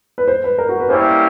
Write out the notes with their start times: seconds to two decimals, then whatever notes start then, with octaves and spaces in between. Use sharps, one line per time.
0.18 B4
0.28 C5
0.44 B4
0.58 A#4
0.69 F#4
0.80 B4
0.89 G3 A#3 C#4 E4 G4 C5